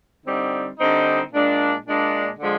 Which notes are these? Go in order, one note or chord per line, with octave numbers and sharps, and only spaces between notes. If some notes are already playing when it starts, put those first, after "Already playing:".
D3 G3 C4 D#4
D3 G3 C4 D#4
A#2 G#3 D4
A#2 G#3 D4
D3 F3 G#3